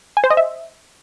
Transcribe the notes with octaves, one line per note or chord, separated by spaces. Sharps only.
G#5
C5
D#5
E5